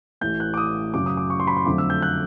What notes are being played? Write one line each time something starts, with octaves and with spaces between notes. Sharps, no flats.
A1 A2 E3 A3 G6
F#6
D6
D#6
F#2 C#3 F#3 D6
D#6
D6
C#6
C6
B5
C6
F2 D3 F#3 A3 D6
E6
G6
F#6